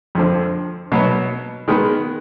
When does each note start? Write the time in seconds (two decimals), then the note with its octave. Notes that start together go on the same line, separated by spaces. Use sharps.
0.15 F2 D3 F3
0.92 B2 F#3 B3
1.68 D#3 G#3 B3